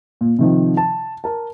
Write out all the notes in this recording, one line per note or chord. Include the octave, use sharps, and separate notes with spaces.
A#2
C3 D#3 F3
A5
A#4 A5